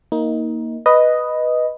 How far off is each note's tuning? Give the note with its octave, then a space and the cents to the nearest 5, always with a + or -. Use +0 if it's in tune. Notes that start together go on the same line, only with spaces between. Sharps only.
A#3 +0 D#4 +20
B4 +0 D#5 +0